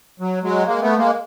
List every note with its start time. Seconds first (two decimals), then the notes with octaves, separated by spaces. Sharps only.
0.20 F#3
0.43 F#3 G#3
0.66 G#3 A#3
0.81 A3 B3
0.97 G#3 A#3